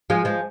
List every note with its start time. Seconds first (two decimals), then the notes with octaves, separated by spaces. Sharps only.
0.10 F3 G#3
0.25 F3 G#3